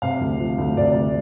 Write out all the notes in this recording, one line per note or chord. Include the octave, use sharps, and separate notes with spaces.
C3 F5
D2
F3
D2
C3 D5
D2